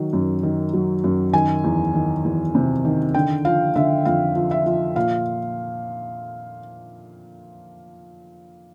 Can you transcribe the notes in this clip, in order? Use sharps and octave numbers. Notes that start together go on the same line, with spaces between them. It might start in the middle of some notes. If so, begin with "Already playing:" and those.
Already playing: D#3 F#3
F#2
D#3
F#3
F#2
D#3 G#5
E2
D#3
E2
C3
D#3
D3 G5
F3 F5
D3 E5
F2 F5
F3
E5
F3
A#2 F5